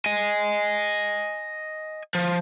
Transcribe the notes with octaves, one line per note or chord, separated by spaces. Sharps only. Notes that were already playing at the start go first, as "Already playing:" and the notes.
D#5 G#5
F3